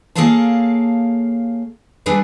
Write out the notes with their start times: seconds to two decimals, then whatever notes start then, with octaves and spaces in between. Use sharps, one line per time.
0.15 A#3 G#4 A4 C#5 F5 A5
2.06 G3 D4 G#4 A4 B4